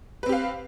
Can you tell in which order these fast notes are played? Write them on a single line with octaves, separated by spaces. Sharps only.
B4 C4 G4 F5